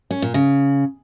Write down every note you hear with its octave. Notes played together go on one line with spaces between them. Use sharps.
C#4
A#2
C#3